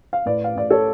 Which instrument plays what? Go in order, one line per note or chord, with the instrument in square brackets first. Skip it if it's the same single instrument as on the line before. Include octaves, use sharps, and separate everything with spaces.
[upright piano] F5
A2 B4 D5
F5
A2 D5
A4 C#5